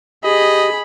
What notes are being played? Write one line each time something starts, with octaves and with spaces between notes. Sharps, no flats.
G4 G#4 D#5 B5